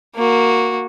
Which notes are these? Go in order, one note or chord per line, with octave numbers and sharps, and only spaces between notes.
A#3 F#4